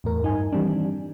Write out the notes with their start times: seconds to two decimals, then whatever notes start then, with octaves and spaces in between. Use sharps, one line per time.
0.04 E2 A2 A#4
0.23 G2 D#4 G#5
0.53 D#3 E3 G3 C4 D4